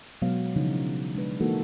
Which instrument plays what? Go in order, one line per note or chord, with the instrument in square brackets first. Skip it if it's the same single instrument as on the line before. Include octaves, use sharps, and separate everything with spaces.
[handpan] B2 F#3 G#3 B3 F5
C#3 E3 F3 D4 D#4
G#3 D4 B4
E3 G#3 A#3 D#4 F#4 A4